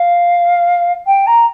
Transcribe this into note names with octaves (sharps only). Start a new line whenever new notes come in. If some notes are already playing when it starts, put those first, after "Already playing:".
Already playing: F5
G5
A#5